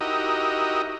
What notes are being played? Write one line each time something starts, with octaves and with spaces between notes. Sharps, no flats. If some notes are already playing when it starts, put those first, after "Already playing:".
D#4 E4 F#4 G4 A#4 D#5